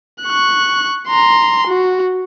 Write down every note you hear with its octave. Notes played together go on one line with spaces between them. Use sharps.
C#6 F#6
A#5 C6
F#4